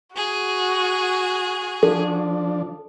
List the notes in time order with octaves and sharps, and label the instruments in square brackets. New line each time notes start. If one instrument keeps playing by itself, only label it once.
[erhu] F#4 [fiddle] G#4
[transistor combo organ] F3 D4 [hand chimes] A4